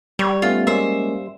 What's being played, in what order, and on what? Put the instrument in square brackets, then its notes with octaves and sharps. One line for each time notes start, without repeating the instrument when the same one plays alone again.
[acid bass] G3 [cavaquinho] C#5
[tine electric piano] A3 B3 C#4 [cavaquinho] F4
[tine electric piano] G#3 A#3 C#4 [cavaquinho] C5 E5